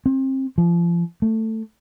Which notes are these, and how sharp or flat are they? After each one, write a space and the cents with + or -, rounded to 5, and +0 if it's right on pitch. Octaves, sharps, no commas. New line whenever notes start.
C4 +30
F3 -30
A3 +10